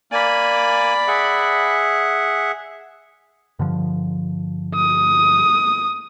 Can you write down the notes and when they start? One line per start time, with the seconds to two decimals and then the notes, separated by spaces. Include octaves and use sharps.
0.12 A#3 D5 G#5 B5
1.08 G#4 E5 F#5
3.59 G2 D3 F3
4.75 D#6